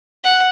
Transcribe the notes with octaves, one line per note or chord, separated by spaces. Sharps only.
F#5